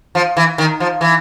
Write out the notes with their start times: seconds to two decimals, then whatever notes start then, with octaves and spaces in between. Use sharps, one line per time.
0.15 F3
0.37 E3
0.58 D#3
0.80 F3
1.01 E3